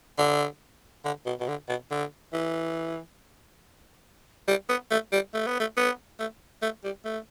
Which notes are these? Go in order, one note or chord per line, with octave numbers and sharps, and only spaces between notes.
D3
D3
B2
B2
D3
B2
D3
E3
G3
B3
A3
G3
A3
B3
A3
B3
A3
A3
G3
A3